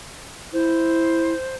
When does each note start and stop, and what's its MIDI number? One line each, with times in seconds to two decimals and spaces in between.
0.53 1.34 64
0.53 1.55 72